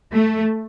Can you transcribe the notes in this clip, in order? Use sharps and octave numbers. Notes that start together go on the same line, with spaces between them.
A3